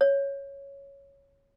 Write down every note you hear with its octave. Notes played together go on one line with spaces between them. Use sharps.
C#5